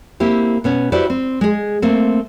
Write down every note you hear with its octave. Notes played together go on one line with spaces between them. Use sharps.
A#3 C4 E4 G4
B2 B3 C#4
E4 F#4 G4 B4 C5 D5
C4
G#3 G#4
A3 A#3 C4